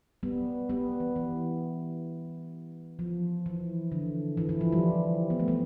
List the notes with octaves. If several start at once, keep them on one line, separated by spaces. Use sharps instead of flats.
G3 B3
G3 B3
E3
E3
F3
E3
D3
E3
E3
F3
G3
B3
A3
G3 B3